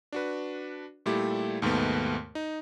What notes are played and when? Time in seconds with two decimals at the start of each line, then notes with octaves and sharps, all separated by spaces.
0.13 D4 F#4 B4
1.06 A#2 G3 A3 E4 G4
1.62 D#2 G#2 B2 A3 B3
2.35 D#4